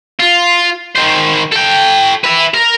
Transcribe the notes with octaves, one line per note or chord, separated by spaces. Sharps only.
F4
D#3 C5
A4 G5
B4 E5
A#4